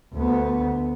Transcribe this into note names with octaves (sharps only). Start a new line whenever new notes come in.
D2 B3